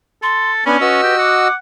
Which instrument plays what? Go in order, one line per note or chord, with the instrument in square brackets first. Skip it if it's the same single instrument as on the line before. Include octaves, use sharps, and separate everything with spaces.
[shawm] A4 [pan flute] C6
[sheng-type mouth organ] B3 D4 G#5 [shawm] C#4 [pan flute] B5
[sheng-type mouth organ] F#4 D#5 E6 [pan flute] B4
[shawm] G4
[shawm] F#5 [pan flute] D6